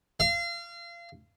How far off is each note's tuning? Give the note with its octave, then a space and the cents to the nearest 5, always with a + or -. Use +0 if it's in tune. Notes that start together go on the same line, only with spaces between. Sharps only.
F5 -30